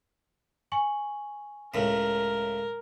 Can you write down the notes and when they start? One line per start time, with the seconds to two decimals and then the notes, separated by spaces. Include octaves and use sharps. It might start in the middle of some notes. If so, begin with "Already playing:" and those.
0.72 G#5 C#6 F#7
1.74 C#2 A2 A#4